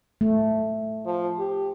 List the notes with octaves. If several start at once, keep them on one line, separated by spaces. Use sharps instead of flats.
A3
F3
G4